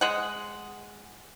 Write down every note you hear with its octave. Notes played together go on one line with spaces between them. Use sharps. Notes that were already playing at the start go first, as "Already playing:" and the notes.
G#3 F#5